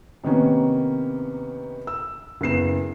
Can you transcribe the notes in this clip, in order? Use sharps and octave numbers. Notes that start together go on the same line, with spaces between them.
C3 D#3 A#3 B3 C#4
E6
F#1 B3 C7 E7